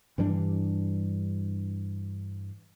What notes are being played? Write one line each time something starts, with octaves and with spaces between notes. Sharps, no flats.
G2 E3 G3 D4